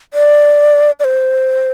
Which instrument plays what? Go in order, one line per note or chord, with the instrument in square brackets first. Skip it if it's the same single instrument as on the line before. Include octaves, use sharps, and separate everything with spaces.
[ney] D5
D5
C5